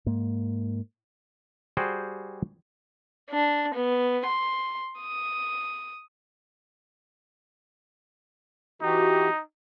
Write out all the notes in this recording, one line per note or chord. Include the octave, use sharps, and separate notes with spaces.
G#2 A#3
G3 F#4 G#4 C5 G5
D4
B3
C6
D#6
E3 D#4 F#4 G4